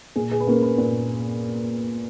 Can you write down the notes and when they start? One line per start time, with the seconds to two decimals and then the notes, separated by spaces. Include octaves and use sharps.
0.16 A#2 G#4
0.32 G#4
0.40 B4
0.47 A#3 C#4 A#4
0.63 B4
0.78 A#2